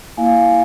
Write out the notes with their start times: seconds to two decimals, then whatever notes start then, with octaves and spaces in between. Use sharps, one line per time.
0.17 A#3 E4 F5 G#5